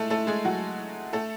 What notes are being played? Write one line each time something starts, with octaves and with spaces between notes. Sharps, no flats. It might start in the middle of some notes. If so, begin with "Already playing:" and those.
Already playing: G#3 A3 A4
A3 A4
G#3 G#4
F#3 F#4
A3 A4